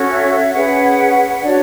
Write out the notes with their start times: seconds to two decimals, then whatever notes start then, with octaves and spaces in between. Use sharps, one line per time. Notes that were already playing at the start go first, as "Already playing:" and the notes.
Already playing: C#4 F#4 A4 C#5
0.10 E5
0.54 C#4 G#4 B4 F#5
1.42 D4 F#4 C#5 D5